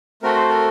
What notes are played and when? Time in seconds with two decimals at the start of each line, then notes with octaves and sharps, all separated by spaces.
0.23 A3 C4 F#4 A4 A#4
0.36 C5
0.49 A#4